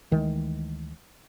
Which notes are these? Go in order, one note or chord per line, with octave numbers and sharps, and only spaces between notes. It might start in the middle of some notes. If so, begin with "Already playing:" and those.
D2 D#3 E3 G#3